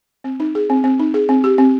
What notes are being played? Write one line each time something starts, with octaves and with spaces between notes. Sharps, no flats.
C4
D#4
G#4
C4
C4
D#4
G#4
C4
G4
C4